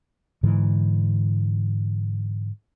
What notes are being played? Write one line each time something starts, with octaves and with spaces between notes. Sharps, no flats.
G#2 D3 E3